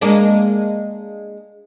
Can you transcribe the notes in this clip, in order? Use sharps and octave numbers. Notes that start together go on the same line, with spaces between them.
G#3 A#3 D4